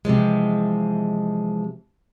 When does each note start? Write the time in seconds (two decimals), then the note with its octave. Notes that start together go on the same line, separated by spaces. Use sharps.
0.05 C3 E3 F3 G#3